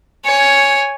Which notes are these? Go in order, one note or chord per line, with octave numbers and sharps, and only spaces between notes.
C#5 G#5